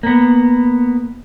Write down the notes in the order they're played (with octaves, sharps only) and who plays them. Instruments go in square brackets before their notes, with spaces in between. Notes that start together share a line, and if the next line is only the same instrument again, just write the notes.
[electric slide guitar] A#3 B3